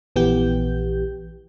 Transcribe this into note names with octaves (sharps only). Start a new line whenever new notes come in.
A#1 E3 B3 G4 G6